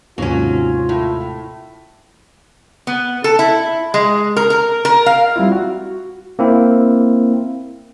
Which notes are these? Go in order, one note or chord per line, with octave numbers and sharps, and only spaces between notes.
D#2 G#2 C3 F#3 C#4 F4
A2
B3
A4
E4
G#3
A#4
A#4
A#4
F5
G3 C4 E4 F4
F#4
A#3 C4 E4